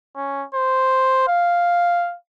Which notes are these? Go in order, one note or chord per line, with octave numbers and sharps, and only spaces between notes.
C#4
C5
F5